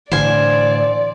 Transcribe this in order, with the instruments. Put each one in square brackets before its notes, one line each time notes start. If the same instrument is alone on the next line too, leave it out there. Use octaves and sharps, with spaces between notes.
[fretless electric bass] A2 D3 E3 [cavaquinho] C5 F5 G#5 [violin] D5